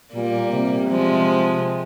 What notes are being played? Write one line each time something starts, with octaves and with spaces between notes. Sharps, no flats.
A#2 G3 A#3
C3
F3 G#3